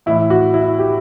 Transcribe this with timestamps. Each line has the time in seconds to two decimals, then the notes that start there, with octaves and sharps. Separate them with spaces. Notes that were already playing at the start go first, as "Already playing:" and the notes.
0.06 A2 E3 E4
0.30 F#4
0.54 E4
0.79 G4